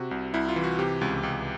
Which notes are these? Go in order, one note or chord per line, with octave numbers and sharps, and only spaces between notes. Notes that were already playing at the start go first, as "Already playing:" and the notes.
Already playing: C3 F#4
C2
C2 E4
F4
E3
F#4
C3 G4
C#2
C#2